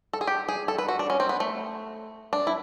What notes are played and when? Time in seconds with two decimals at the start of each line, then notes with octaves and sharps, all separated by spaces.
0.13 A4
0.21 G#4
0.27 G4
0.48 G#4
0.68 A4
0.78 B4
0.88 F#4
0.99 D4
1.10 C#4
1.20 C4
1.29 B3
1.40 A3
2.33 D4
2.47 E4